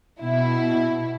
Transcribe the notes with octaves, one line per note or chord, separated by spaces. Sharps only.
B2 E4